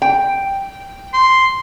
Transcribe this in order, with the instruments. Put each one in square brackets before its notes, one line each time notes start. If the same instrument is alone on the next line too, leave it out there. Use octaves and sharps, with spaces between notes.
[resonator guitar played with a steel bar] G5
[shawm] C6